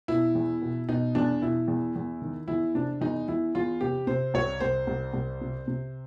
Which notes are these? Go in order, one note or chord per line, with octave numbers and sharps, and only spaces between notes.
B2 E4
E2
B2
B2 D#4
E2 D4
B2 E4
E2
E2
D#3
E2 E4
C3 D4
E2 D#4
E2 E4
E2 F4
C3 G4
C3 C5
C2 C#5
C2 C5
C2
C2
C3
C3